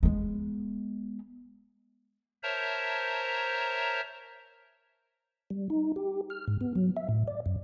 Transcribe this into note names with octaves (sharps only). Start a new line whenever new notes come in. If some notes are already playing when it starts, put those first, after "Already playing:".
G#3 B3
A#4 C5 C#5 E5 A5 A#5
G3
D#4
G4
F6
G#2
B3
F#3
E5
A2
D5
F#2